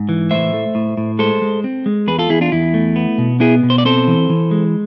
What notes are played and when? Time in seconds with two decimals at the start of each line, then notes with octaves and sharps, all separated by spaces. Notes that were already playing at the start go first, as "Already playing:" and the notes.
Already playing: G#2
0.09 E3
0.31 A2 C5 E5
0.54 A3
0.75 A2
0.98 A2
1.19 G#3 A4 C5
1.42 G#3
1.64 C4
1.86 G#3
2.07 E2 G#4 B4
2.19 F4 A4
2.29 E2 E4 G#4
2.41 D4 F4
2.52 E2 E4
2.74 A3
2.96 B3
3.18 B2
3.40 B3 E4 G#4
3.63 B2
3.70 C5
3.78 D5
3.85 C4 A4 C5
4.07 E3
4.30 E3
4.51 G#3